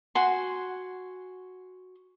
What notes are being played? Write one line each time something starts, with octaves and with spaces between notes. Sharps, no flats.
F#4 G#5 C6